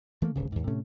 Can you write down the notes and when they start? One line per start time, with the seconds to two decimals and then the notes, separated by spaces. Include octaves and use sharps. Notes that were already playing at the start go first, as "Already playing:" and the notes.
0.22 E3 A3 A#3
0.35 D1 G1 C#3
0.52 D#2 G#2
0.67 A2 C3 A3 C#4